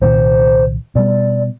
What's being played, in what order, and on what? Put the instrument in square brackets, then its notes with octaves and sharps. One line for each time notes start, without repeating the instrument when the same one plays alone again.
[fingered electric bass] C2 A#2 D#3 [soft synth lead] C5
[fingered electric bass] B2 G3 [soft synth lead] D5